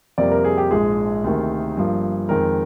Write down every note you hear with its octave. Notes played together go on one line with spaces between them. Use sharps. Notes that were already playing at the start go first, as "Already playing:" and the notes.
F2 C3 G3 A#3 D5
A#4
G#4
G4
A#1 G#2 F3 G#3 G#4
D2 C3 D#3 A#3
G1 G2 F3 A#3
F2 D#3 G#3 A#4